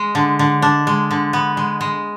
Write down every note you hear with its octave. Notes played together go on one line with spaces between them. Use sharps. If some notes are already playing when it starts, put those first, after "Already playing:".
Already playing: G#3
D3
D3
D4
G#3
D3
B3
G#3
G#3